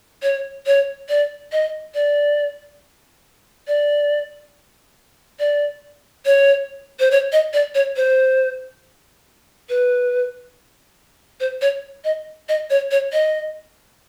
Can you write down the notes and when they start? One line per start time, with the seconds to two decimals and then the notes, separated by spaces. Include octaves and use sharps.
0.23 C#5
0.66 C#5
1.09 D5
1.52 D#5
1.95 D5
3.68 D5
5.39 D5
6.26 C#5
7.00 C5
7.11 C#5
7.32 D#5
7.53 D5
7.75 C#5
7.96 C5
9.69 B4
11.40 C5
11.62 C#5
12.05 D#5
12.49 D#5
12.70 C#5
12.91 C#5
13.13 D#5